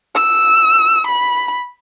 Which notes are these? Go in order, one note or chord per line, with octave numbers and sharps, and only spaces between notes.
E6
B5